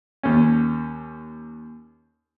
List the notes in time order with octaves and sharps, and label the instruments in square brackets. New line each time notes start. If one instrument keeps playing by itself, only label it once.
[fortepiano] D#2 C#4